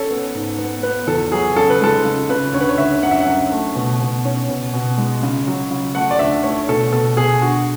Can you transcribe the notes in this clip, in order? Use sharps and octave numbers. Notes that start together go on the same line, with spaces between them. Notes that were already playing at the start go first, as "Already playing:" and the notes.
Already playing: C#4 A4
B3
G#2
B3
B3 B4
E2 A4
F#3 G#4
C#3 A4
B4
G#3 A4
C#3
C#3 B4
D2 C#5
B4
C#5
D2 E5
F#2 F#5
E5
F#5
F#2
A3
B2
B2
C#4
B2
B2
G#3
C#3
F#3
C#3
A3 F#5
D5
D2 E5
A3 C#5
B2 A4
B2 A4
B2 G#4
D3 F#4